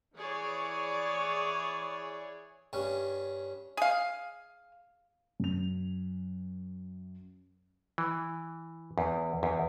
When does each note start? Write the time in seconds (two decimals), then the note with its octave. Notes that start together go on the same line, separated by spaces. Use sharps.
0.16 E3 G#4 C#5 D5
2.73 G2 C#4
3.77 G#4 F5
5.40 F#2 F7
7.98 E3
8.98 E2
9.43 E2